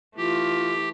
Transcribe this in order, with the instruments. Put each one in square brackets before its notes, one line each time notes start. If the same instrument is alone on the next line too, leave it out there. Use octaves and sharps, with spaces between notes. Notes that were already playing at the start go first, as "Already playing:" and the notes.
[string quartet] E3 A3 [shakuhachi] F4 [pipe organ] G4